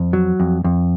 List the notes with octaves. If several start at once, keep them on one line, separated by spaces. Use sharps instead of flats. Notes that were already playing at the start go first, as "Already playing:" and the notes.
Already playing: F2
F#3
F2
F2